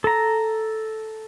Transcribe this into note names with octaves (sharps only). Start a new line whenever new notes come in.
A4 A#5